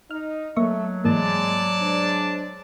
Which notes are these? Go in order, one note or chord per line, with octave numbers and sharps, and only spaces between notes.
D#4 D#5 F6
F#3 A3 A#3 E5 C#6
G#2 E3 G#3 A#3 D5 A5
G#3 D4 C5